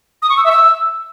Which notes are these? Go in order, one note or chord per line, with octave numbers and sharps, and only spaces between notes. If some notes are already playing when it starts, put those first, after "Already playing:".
D#6
C#6
E6
E5
E6